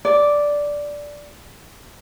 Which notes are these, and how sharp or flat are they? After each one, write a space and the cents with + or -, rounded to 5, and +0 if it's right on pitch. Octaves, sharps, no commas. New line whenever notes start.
D5 -5